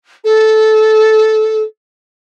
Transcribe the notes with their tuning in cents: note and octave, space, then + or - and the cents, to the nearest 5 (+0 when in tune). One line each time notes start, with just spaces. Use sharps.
A4 -15